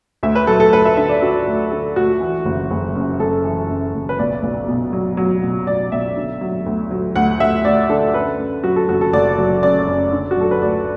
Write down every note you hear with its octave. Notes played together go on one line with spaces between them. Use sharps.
D2 E5
B4
F#3 A4
A4
D2 B4
E5
D3 E5
D5
D3 F#4
D2
D3 A4
D2 F#4
E3
F#1
F#1
F#2
F#2 A4
E3
F#2
F#1
B4
B1 D5
B1
B2
F#3
F#3
B2
F#3 D5
B1 E5
D3
F#3
D2
F#3
D2 F#5
D2 E5
D2 D5
D3 A4
F#2 B4
F#2
F#3 F#4
A4
F#1 F#4
A4
F#1 D5
F#3
F#2 D5
F#2
D3
F#4
F#3 A4
B4
D2 D5